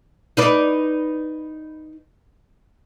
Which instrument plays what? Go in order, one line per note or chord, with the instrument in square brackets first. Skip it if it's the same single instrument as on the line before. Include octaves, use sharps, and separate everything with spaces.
[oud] D#4 B4 D5